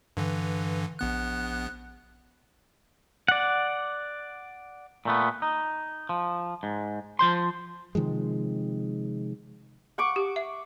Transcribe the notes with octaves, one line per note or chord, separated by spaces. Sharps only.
G2 D3 E3
A#1 B3 F#6
D5 F#5
A#2 A3 B3
D#4
F3
G#2
F3 C5 C6
C3 D#3 F3 G#3
F#5 C#6 D6
G4
E5